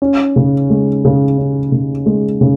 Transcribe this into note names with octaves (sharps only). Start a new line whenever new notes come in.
C#4
C#3
G#3
C#3
C#4
C#3
G#3
C#3